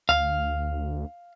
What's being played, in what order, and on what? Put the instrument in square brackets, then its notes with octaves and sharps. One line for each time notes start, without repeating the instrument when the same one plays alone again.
[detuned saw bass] D2 [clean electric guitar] F5